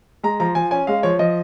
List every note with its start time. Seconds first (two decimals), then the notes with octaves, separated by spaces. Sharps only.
0.23 G#3 A#5
0.40 F3 A#5
0.55 F3 G#5
0.71 C#4 G#5
0.87 G#3 F5
1.03 F3 C#5
1.19 F3 D#5